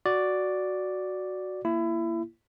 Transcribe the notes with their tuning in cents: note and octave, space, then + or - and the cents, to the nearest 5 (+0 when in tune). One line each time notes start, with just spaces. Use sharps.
F#4 +0 D5 +0
A#3 +0 E4 +25